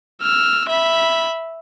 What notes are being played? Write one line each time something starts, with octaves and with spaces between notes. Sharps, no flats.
E6 F6
E5 B5